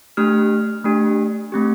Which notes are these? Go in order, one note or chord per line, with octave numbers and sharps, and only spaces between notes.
A3 D4 G4 F6
A3 D4 G4
A3 C4 G4